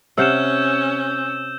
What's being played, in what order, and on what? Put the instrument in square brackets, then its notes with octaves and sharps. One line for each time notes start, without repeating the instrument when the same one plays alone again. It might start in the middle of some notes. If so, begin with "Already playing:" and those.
[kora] C3 F5 F#5 [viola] C#4 [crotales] E6 G6 E7